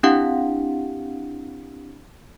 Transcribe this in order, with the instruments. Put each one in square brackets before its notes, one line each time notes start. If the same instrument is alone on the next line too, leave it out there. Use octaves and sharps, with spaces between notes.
[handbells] C4 D4 E4 G4 F5 F#5